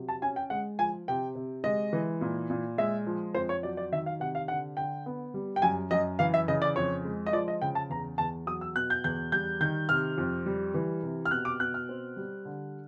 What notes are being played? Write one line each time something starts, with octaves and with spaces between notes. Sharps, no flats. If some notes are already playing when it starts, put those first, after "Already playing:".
Already playing: C3 F#3
A5
C#4 G#5
G5
G#3 F#5
F3 G#5
C3 G5
C3
G#3 D#5
E3
A#2
A#2
G#3 E5
F3
F2 C5
C#5
F#3 D5
D5
D#3 E5
F5
C3 F#5
F5
D3 F#5
D3 G5
B3
G3
G5
F#2 G#5
F#2 D#5
E3 F5
E5
C#3 D#5
D5
F2 C#5
G#3
D#5
F3 D5
D#5
C#3 G5
A5
E2 A#5
E2 A5
F#3 D#6
E6
B2 F#6
G6
E2 G6
G3 G6
D#3 G6
C3 F6
F2
G3
E3
C3
F6
B2 F#6
D6
B2 F#6
F6
C4
G3
D3